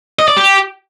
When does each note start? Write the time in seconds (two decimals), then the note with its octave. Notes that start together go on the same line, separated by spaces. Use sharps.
0.19 D#5
0.28 D5
0.37 G4